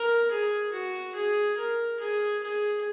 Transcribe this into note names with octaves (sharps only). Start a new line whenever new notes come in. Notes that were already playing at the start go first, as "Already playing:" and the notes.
Already playing: A#4
G#4
F#4
G#4
A#4
G#4
G#4